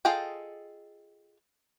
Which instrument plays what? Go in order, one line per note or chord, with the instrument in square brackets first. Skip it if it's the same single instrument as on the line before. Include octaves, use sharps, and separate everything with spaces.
[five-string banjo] F4 G#4 A4 D#5 G5